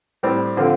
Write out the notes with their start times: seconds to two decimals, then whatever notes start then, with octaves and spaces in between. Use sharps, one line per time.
0.23 A2 G3 C4 G4
0.57 D3 F3 C4 F4